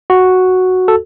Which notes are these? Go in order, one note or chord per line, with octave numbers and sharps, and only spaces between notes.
F#4
A4